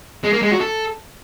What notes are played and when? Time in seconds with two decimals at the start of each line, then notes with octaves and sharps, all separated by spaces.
0.24 G#3
0.33 A#3
0.42 G#3
0.51 F#4
0.61 A4